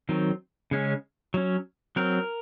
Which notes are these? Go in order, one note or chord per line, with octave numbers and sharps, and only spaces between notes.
D#3 F#3 C4
C#3 G#3 C#4
F#3 C#4
F#3 C4 A#4